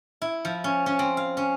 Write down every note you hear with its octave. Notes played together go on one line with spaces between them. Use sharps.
E4
F3
C#4
C#4
C4
F5
C#4